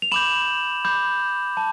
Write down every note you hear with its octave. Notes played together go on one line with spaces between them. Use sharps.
F7
B5 D6 G6 E7 F#7
B5 D6 G6
A5